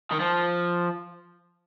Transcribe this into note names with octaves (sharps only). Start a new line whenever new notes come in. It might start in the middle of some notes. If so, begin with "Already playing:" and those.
D#3
F3